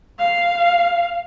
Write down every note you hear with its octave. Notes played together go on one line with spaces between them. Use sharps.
F5